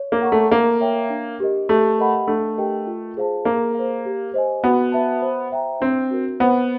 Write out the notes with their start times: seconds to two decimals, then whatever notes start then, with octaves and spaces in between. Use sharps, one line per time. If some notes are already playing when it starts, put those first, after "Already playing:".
Already playing: C#5
0.12 A#3
0.22 F#5 A#5 C#6
0.32 A3
0.51 A#3 A#4
0.81 C#5 E5 G5
1.10 D4
1.40 G4 A#4 D#5
1.69 A3 G4
1.99 A#4 D#5 F#5 B5
2.28 A3 D4
2.58 G4 A#4 D#5 G5
2.87 F4
3.17 G#4 C5 F5 A5
3.45 A#3 G#4
3.75 C5 F5
4.05 G4
4.34 C5 D#5 G#5
4.64 B3 F#4
4.92 B4 E5 A5
5.22 C5
5.52 E5 G5 A#5
5.80 C4 D4
6.11 F#4 A#4
6.40 B3 C5